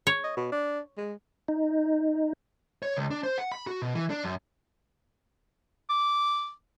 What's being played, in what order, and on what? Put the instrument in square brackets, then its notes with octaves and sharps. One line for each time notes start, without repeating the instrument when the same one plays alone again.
[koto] C#5
[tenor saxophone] D#5
B2
D4
G#3
[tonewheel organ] D#4
[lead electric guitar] C#5
C#2
D4
C5
F#5
B5
F#4
B2
E3
D4
F#2
[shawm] D6